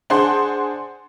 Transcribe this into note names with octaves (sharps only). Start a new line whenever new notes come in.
D4 G#4 C5 F#5 C6